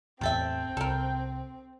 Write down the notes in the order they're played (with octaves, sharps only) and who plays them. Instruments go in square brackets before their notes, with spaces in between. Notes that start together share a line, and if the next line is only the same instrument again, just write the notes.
[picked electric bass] A1 E2 [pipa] C3 A4 E5 [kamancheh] C4 [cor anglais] G5
[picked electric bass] C2 [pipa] A4 A#4